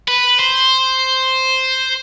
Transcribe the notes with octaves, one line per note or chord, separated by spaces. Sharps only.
B4
C5